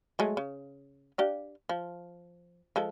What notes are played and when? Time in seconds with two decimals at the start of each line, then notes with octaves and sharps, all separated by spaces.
0.19 F#3 G#3 A3
0.37 C#3
1.18 D4 G4 F5
1.69 F3
2.76 F3 G#3 A4